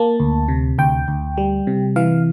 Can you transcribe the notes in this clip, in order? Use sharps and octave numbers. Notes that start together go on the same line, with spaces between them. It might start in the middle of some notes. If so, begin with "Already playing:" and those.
Already playing: A#3 A5
D2
C3
D2 G5
D2
G3
C3
E3 F5